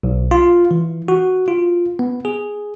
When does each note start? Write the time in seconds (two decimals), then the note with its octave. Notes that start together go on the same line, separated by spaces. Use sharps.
0.03 B1
0.31 F4
0.71 E3
1.08 F#4
1.48 F4
1.99 B3
2.25 G#4